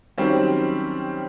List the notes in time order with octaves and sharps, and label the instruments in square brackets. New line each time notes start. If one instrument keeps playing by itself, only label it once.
[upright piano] D#3 F#3 G3 C4 C#4